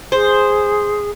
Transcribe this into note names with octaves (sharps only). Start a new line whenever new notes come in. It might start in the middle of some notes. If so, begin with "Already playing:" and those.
G#4 C5